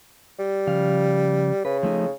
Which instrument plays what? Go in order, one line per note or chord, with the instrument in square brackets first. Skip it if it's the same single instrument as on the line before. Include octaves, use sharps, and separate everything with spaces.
[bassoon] G3
[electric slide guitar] C#3 F3 F5
[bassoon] C#3 [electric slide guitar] B4
[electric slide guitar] F3 A3 D#4